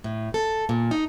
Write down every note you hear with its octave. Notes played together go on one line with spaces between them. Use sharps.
A2
A4
A#2
D#4